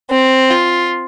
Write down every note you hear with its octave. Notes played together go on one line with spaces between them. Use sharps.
C4
F4